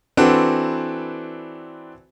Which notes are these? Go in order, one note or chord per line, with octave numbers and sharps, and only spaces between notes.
E3 C4 D4 F#4 A4 B4